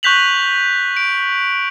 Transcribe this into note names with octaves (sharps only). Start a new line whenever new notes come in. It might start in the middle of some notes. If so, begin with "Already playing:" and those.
C#6 F#6 G6 B6 F7 F#7
D7